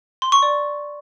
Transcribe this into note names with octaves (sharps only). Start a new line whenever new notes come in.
C6
C#6
D5